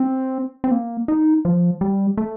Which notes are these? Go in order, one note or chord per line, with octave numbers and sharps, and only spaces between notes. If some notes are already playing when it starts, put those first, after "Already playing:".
Already playing: C4
C4
A#3
D#4
F3
G3
A3